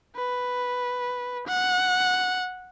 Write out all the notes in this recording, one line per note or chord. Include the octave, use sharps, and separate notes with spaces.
B4
F#5